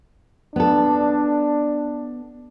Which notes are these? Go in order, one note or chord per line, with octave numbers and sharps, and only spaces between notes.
B3 D4 A4